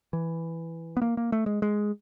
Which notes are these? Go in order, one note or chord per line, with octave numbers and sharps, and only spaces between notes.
E3
B3
A#3
A#3
A3
G#3
G#3